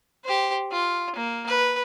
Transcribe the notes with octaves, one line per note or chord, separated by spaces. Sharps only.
G4 C5
F4
A#3
B4